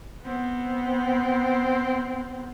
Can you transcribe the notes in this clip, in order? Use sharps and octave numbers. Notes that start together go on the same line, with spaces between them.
B3 C4